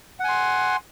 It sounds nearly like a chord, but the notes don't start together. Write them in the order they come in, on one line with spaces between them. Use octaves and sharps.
F#5 G#5 C6